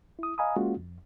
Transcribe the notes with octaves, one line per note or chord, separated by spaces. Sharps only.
E4 D#6
D#5 F5 G#5 A#5 B5 D#6
G#3 A#3 C#4 F4 F#4
F2